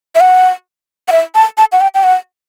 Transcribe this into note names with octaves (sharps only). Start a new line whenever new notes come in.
E5
F#5
F#5
E5
A5
A5
F#5
G5
G5
F#5